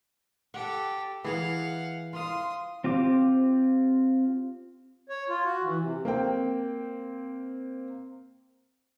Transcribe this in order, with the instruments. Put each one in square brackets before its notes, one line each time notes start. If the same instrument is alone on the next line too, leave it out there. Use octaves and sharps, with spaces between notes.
[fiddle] G4 A4 [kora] F#5
[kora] E3 G#4 [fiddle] F5 F#5
[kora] F4 F5 [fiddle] C6 D#6
[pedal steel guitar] C4 F4 G4 D6
[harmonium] C#5
F4
F#4
E3
C3
[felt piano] A#3 C4 G5